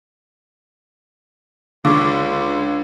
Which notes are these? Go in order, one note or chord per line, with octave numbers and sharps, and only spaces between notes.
C#2 D3 F5 C#6 D6